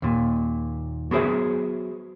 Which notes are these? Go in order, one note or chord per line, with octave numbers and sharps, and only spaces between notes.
D#2 A#2
F#3 B3 G#4 C5 E5